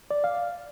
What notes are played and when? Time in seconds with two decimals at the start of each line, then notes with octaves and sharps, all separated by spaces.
0.11 D5
0.24 F5